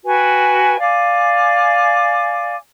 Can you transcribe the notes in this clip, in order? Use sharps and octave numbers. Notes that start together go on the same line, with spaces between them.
F#4 B4 G5 G#5
D5 F5 G#5 D6